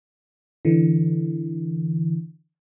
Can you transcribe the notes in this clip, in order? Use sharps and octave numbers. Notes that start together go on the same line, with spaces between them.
D3 E3